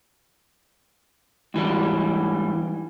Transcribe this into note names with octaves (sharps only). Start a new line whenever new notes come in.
G#2 E3 G3